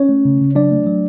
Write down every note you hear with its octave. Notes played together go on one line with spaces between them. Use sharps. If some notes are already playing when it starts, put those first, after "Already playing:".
Already playing: C#4 C#5
A3
C#3
C#3
F#3 D4 D5
A3
F#3